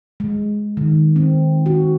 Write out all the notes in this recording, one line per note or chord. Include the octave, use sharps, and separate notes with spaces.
G#3
D#3
C4
F#4